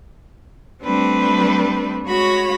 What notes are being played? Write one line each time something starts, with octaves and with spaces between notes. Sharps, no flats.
G3 A3 C4 D4 B4
G#3 F#4 C#5 B5 A#6